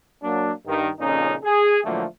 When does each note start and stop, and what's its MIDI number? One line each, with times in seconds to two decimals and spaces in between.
0.23 0.52 54
0.23 0.52 58
0.23 0.52 62
0.66 0.90 43
0.66 0.90 51
0.99 1.35 41
0.99 1.35 46
0.99 1.35 49
0.99 1.35 61
0.99 1.35 63
1.44 1.80 68
1.85 2.04 45
1.85 2.04 50
1.85 2.04 53
1.85 2.04 54
1.85 2.04 57
1.85 2.04 58